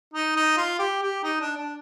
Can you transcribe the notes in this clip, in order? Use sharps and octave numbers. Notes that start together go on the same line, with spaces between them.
D#4
D#4
F4
G4
G4
D#4
D4
D4